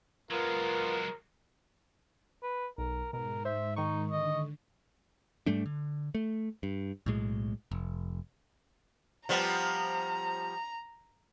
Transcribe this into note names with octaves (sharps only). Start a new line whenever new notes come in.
F#3 G#3 B3 F4 A#4
B4
B1 A#4
G#2 B2 A#4
C5 E5
D#3 D#4 C#6
D3 D#5
G#2 G3 A3 D4
D3
A3
G2
B1 A2 G#3
F1
F3 G3 B3 A#5